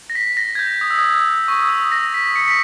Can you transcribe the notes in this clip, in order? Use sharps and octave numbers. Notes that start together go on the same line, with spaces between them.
A#6
B6
A#6
G#6
G6
D#6
E6
D#6
E6
C#6
E6
D#6
A#6
B6
C#7
B6